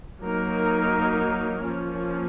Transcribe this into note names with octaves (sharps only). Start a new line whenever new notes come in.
F#3 A#3 D#4 A#4
F3 A#3 C#4